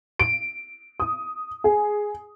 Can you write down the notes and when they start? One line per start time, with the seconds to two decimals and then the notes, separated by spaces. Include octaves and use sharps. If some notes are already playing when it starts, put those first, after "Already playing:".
0.19 D7
1.00 D#6
1.64 G#4